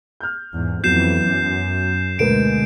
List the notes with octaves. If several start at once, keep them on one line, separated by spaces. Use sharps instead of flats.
F6 G6
E2 G#2
F2 E3 F#3 B3 G6 C7 E7
F#2
D2 B2 D3 G#3 A#4 B4 D7 E7